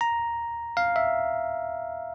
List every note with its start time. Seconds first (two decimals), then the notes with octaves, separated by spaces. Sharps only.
0.01 A#5
0.77 F5
0.96 E5